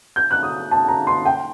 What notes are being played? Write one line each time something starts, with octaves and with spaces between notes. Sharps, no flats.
G6
F#6
D#6
A5
A#5
C6
G5